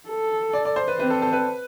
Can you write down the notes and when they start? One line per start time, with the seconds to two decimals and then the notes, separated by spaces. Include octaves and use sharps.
0.09 A4
0.53 D5
0.65 D5
0.76 C5
0.88 B4
0.99 C4 B4
1.10 A4
1.22 A4
1.33 B4